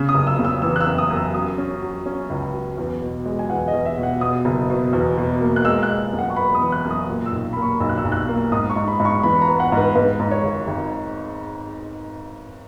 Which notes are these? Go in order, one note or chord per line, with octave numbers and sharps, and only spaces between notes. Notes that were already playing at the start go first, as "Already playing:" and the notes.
Already playing: C#3
D#6
F#1
E6
C#3
E6
E3 E6
F#6
E6
F#2
D#6
F#2
E6
F#3 D#6
C#4
F#3
C#4
C#2
F#3
E2
B2
G#3
G#5
E2 F#5
D#5
E2
E5
B2
F#5
B2 D#6
F#1
B2
E2
B2
A#3
F#6
G#3 E6
F#6
G#3
F#2
F#5
C#6
B3 B5
D#6
E3
F#6
F#2
D#6
A#2
E6
B1
A#3 B5
C#6
B1 E6
F#6
E6
B1
F#6
E6
A#3
G#2 D#6
C#6
G#2
B5
G#2
C#6
E3 B5
A#5
B3
F#5
G#2
B4
G#2 B4
G#2
C#5
G#1
G#1